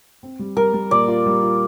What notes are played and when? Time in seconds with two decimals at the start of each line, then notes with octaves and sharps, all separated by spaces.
0.23 C4
0.39 G3
0.57 G3 A#4
0.73 G3
0.91 A#2 D5
1.08 F4
1.26 G3
1.43 F4